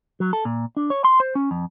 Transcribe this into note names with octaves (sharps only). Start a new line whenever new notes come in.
F#3
A4
A#2
D4
C#5
C6
C5
C#4
F2